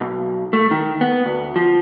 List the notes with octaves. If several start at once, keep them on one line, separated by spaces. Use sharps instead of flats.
B1
A3
D#3
B3
D2
F3